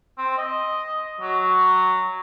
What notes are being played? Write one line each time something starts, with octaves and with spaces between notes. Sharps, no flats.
C4
D#5
F#3